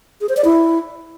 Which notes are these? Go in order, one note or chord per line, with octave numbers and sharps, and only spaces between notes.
G#4
C5
D5
E4